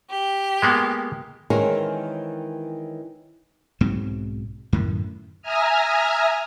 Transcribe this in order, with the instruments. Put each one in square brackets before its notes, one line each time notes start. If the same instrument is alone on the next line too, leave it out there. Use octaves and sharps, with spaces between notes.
[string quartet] G4
[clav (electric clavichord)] G#3 A#3 B3
[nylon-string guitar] D#3 E3 G#3 C4 C#4 A#4
[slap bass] B1 G#2 F#3 C4
F#2 A2 D#3
[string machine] E5 G#5 A#5 D#6 F6